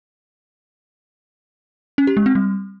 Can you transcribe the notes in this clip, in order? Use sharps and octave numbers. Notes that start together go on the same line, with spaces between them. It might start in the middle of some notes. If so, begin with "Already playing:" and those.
C#4
G4
G#3
C4
G3